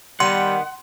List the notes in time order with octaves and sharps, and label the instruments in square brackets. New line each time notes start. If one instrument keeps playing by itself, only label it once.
[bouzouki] D#3 B3 [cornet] G3 [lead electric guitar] F#5 [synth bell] C6